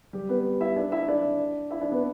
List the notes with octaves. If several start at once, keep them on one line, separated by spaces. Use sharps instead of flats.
G3 G4
B3 B4
E4 E5
D4 D5
E4 E5
E5
D4 D5
E4 E5
D4 D5
B3 B4